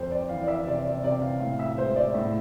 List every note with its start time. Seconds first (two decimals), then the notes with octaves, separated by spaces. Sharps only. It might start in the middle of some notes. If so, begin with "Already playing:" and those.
Already playing: F2 C5
0.11 D5
0.29 E3 F5
0.43 D5
0.48 E5
0.66 C3 D5
0.85 D5
1.03 C3 D5
1.22 F5
1.40 A2 F5
1.59 E5
1.77 G#3 C5
1.96 D5
2.14 A2 E5